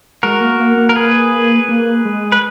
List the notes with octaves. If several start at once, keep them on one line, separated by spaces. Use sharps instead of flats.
G#3 F#4 A#4
A#3
A#3
A#3
A#4
G#4 B4
A#3
G#3
B4